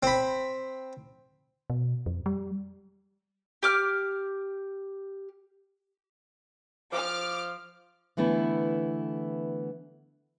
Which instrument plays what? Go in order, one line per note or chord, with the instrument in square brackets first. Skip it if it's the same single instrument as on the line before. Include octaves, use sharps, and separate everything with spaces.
[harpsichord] C4 B5
[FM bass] B2
F2
G3
[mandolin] G4 D6 F6
[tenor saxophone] F3 [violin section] D6 F6
[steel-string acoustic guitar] D3 E3 A3 B3 E4